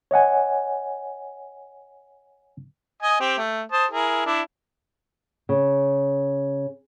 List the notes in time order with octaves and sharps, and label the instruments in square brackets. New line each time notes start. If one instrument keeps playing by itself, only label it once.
[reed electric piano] C#5 D#5 F#5 G#5
[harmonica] D#5 G#5 D#6
C4 G4
A3
C5 A5 D#6
E4 G#4 A#4
D4 E4
[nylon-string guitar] C#3